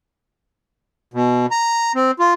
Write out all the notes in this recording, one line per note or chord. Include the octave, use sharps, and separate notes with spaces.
B2
A#5
C4
F4